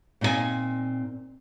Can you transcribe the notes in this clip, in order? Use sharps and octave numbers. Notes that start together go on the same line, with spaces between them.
A#2 C4 D#4 E4 G#5